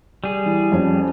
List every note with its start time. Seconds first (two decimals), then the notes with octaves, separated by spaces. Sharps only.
0.24 G3 G#4
0.46 E3
0.72 F2 C#4